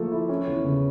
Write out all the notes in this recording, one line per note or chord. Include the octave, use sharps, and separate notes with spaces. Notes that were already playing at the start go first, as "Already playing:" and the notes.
Already playing: F3 A3 A#3 A4
E4
C#4
E2
C#3